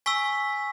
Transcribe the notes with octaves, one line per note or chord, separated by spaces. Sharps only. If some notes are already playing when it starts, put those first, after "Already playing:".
G#5 C#6 E6 B6